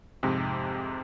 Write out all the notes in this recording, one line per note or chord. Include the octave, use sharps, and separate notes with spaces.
F2 G#2 C3